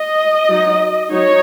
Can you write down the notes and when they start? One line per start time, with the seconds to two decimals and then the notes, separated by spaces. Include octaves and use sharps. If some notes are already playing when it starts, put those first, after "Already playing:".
Already playing: D#5
0.49 F#3 D#4
1.12 F#3 D#4 C#5